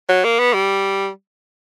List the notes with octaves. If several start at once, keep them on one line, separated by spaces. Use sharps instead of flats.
F#3
A#3
B3
G3